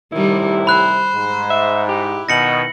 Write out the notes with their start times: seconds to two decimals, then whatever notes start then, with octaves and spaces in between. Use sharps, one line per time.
0.12 C2 A2 C3 D#3 G3 E4
0.67 C5 B5 F#6
1.14 G#2
1.50 E5
1.89 E4 G4
2.29 B2 D#3 A#6 C#7 F#7